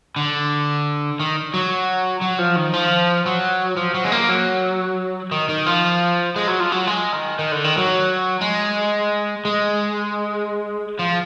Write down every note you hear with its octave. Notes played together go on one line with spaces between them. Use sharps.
D3
D#3
F#3
F#3
F3
D#3
F3
F#3
F3
F#3
G#3
A#3
F#3
D#3
D#3
F3
G#3
F#3
F3
F#3
G#3
D#3
D#3
D3
D#3
F#3
G#3
G#3
F3